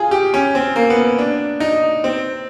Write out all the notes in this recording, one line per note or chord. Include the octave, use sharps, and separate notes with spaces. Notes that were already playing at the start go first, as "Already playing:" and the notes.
Already playing: F4 G#4
G4
C#4
C4
A#3
B3
D4
D#4
C4